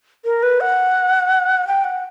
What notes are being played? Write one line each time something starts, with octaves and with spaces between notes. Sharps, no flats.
A#4
B4
F#5
G5
F#5